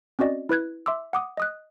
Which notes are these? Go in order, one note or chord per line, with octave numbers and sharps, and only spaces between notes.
C4 C#4 F#4 D5 D#5
E4 B4 F#6 G#6
E5 C6 D6 E6
F#5 D6 D#6
D#5 D#6 F#6